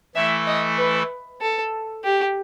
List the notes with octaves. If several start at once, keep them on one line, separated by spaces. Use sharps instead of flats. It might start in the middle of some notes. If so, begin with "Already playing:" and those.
E3 A3 E4 A4 E5
D#5
B4
A4
G4